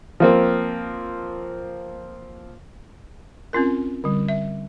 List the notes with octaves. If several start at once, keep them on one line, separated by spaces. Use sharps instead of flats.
F3 A#3 C4
C4 C#4 F4 A#4
D3 G3
E5